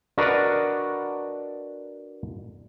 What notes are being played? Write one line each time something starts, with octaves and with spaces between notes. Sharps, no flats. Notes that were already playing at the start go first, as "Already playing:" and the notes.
D4 F#4 A#4 B4 D5 D#5